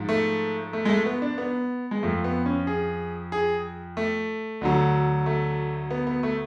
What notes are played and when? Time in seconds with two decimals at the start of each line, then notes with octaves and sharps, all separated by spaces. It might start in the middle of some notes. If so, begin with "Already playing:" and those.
Already playing: G#2 F3
0.09 A3
0.73 A3
0.85 G#3
0.89 A3
1.06 B3
1.22 D4
1.38 B3
1.91 G#3
2.03 F2 F3 A3
2.24 B3
2.46 C#4
2.67 G#4
3.32 G#4
3.97 A3
4.61 D2 D3 F#3
5.26 A3
5.91 B3
6.07 B3
6.23 A3